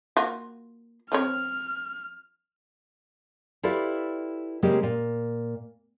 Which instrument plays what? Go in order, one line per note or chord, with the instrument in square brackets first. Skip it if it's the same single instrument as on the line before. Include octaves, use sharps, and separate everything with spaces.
[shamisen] A#3 F4 F#4
[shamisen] F3 C4 C#5 [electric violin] F6
[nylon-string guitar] E4 F4 G4 A4 B4 D5
C#3 G3 G#3 A#3 C4 G4
A#2